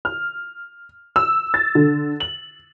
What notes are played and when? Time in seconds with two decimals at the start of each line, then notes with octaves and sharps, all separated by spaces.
0.05 F6
1.16 E6
1.54 A6
1.75 D3
2.20 F#7